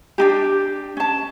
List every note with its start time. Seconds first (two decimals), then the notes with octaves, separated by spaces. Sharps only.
0.18 D4 D#4 G4
0.97 C#4 A5